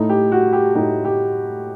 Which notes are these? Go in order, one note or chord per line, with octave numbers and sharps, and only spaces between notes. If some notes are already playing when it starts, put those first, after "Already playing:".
Already playing: A2 A3 D#4
G4
F#4
G4
A2 A3 D#4 G4
G4